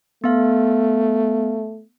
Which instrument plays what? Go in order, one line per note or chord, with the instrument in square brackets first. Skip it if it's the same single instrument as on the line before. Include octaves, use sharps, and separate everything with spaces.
[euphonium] A3 [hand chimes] B3 F5